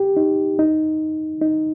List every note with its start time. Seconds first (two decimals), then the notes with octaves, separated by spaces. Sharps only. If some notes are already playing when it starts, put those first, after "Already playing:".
Already playing: G4
0.17 D#4
0.59 D#4
1.41 D#4